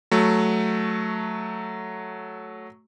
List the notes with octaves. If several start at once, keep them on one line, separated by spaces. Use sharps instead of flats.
F#3 A3